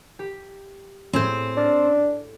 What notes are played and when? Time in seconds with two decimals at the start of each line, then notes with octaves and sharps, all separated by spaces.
0.19 G4
1.13 A2 C4 G#4 C5 G6
1.57 D4 F6 A6 A#6